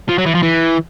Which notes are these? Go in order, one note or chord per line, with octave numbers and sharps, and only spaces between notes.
F3
F#3
E3
F3
E3